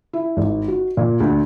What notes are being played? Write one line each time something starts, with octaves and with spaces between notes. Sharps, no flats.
E4
G#1
F#4
A#2
D2